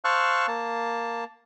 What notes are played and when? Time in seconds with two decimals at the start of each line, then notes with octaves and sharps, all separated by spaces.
0.05 C5 F5 A5 C#6 E6 F#6
0.48 A#3 A5